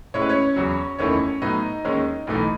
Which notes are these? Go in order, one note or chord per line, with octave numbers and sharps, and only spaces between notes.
A2 G#3 C#4 E4 C#5
B4
C#4 C#5
E2 C#3 F#3
F#1 E2 D#3 A3 C#4 E4 C#5
A2 F#3 B3 D#4 D#5
D#2 D#3 G#3 C#4
B1 A2 E3 A3 D#4